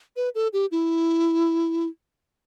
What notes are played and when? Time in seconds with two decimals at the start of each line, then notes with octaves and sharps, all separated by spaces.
0.16 B4
0.35 A4
0.53 G4
0.71 E4